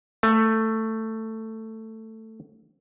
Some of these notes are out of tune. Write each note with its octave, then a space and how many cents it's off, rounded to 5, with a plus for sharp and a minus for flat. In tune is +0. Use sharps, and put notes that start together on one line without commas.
A3 +10